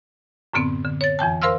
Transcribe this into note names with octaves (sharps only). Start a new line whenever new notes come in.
F#2 A2 D3 B3 C4
D3
C#5 A6
F2 E3 G5 A5
A#4 C5 F5 C6 E6 F6